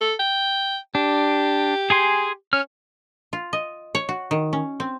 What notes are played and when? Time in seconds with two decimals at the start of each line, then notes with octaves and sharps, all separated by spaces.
0.01 A4
0.19 G5
0.95 D4 G4
1.90 G#4 G#5 C6
2.53 C#4 F6
3.33 F4
3.53 D#5
3.95 C#5
4.09 F#4
4.31 D#3
4.53 C#4
4.80 C4